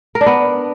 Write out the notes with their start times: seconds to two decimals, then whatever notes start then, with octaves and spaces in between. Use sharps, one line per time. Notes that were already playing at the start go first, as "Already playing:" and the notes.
0.15 A#4
0.21 D4
0.26 B3